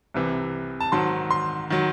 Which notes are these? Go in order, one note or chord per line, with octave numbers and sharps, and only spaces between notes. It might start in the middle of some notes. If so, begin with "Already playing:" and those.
C2 C3 E3
A5
G#2 D#3 F#3 C6
C6
D#3 F#3